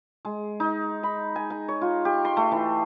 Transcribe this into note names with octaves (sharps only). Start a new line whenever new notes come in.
G#3
D#4
B5
G#5
A#5
C#5
F4
G4
C6
A3
E3